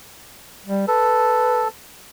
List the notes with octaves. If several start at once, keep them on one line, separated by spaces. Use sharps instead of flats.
G3
A4 B4